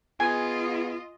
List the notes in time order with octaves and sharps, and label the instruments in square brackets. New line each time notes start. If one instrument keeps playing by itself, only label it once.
[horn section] B3 G#4 [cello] F4 D#5 [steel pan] G#5